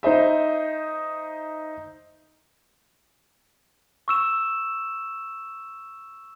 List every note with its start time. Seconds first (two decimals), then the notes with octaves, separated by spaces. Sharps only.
0.03 D#4 C5 D#5 E5
4.08 C#6 E6 E7